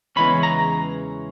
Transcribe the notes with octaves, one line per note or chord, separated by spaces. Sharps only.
E2 C#3 E3 G#3 C#4 B5
A#5